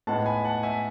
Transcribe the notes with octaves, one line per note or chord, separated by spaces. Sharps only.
A2 G#3 B3 D#4 F#5 A5
G#5 B5
F#5 A5
E5 G#5